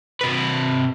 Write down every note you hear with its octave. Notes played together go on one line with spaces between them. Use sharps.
C3 B4